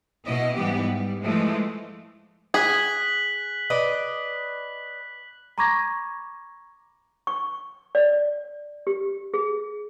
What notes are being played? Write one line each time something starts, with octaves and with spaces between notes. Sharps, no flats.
B2 E4 D#5
G#2 E3 G3 B3 G4
G3
E3 F3 G#3 A3
G#4 F#6 B6 F#7
B4 D5 D#5
A#5 B5 C#6 D6 G#6 A#6
C#6
D5
G4
G#4